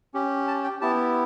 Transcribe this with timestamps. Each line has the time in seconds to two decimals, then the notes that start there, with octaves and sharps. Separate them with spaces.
0.14 C#4 G4
0.48 A5
0.64 G5
0.81 B3 E4 G4 A5